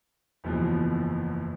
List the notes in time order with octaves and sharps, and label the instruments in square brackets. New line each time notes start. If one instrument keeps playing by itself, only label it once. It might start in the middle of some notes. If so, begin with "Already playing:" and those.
[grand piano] F#1 B1 E2 B2 E3 F3